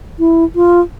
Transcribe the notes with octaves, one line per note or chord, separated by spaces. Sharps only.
E4
F4